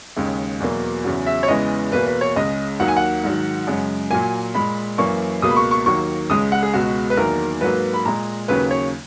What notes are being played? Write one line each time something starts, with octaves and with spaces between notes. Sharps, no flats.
D#2 C#3 G#3
E2 B2 F#3 A#3
E2 C#3 F#3
E5
C#5
E2 C#3 E3 G#3 D#5
E2 B2 A#3 B4
B4
C#5
C#2 C#3 G#3 D#5
D#2 D#3 F#3 A#3 F#5
G#5
F#5
G#2 D#3 F#3
F#2 C#3 G#3
A#2 F#3 A#3 G#5
A#2 G#3 B5
F#2 E3 A#3 C#6
C#2 B2 A#3 D#6
B5
C#6
C#6
D#2 D#3 F#3 A#3 C#6
C#2 C#3 G#3 D#6
F#5
G#4
C#2 B2 G#3 F#4
B4
E2 D#3 F#3 A#3 A#4
G#2 F#3 A#3 B4
B5
A#2 G#3 A#5
D#2 C#3 F#3 A#3 B4
C#5